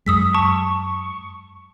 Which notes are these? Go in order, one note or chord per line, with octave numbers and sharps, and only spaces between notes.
F#2 G#3 D#6 E6 B6
A5 C#6